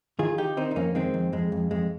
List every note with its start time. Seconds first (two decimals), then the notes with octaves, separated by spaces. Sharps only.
0.19 D#3 F4 G#4
0.38 D#3 D#4 G4
0.57 D#3 C4 D#4
0.71 D#4
0.76 F2 A#3 C#4
0.95 D#3 G#3 C4
1.14 F2
1.33 F2 G#3
1.52 F2
1.71 F2 G#3